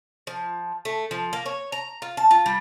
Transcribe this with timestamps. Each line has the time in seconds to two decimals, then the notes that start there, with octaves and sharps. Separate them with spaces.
0.27 F3
0.85 A3
1.11 F3
1.33 A#3
1.46 C#5
1.72 A#5
2.02 F4
2.17 A5
2.31 F4
2.46 G3